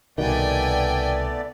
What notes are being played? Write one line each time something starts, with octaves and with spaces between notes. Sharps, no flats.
C2 B2 D#3 A3 B3 D5 G5 G#5